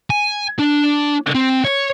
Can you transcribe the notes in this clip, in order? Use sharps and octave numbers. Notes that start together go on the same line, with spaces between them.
G#5
D4
C4
C#5